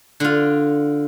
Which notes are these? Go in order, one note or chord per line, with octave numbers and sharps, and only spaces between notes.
D3 F4